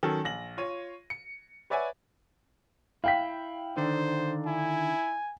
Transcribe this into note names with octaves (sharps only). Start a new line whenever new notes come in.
D#3 F#3 C#4 A4
A#1 A#6 F#7
F4 C#5 D#7
C#7
B4 C#5 D5 E5 F#5 G#5
E4 F5 G5 B6
D3 D#3 D4 C5
E4 G#5